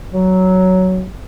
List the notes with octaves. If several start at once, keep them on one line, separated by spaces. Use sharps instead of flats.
F#3